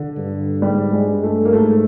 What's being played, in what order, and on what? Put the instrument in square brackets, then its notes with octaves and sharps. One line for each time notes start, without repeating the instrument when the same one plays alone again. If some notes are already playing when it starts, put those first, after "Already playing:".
Already playing: [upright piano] D3
[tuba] G2
[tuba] G#2 [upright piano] G3
[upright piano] G#3
[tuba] G2
[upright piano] A3
A#3
[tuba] G#2 [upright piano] A3